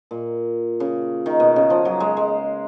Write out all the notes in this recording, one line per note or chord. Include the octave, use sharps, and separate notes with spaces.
A#2
C#3
D#3
B2
C#3
F3
F#3
G#3
G#3